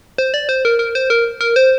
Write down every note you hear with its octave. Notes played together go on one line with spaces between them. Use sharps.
C5
D5
C5
A#4
A#4
C5
A#4
A#4
C5